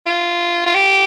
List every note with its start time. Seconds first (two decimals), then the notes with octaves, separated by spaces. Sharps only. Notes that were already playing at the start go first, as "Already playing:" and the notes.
0.06 F4
0.66 F4
0.74 G4